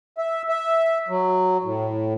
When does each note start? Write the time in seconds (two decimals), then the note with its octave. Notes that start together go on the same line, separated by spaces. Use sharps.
0.18 E5
0.49 E5
1.08 F#3
1.64 A2